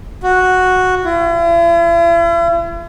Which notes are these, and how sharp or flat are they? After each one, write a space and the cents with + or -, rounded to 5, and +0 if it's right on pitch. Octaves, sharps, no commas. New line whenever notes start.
F#4 -5
E4 +45